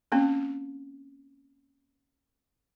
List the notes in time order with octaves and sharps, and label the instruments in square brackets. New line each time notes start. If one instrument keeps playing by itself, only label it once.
[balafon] A#3 C4 C#4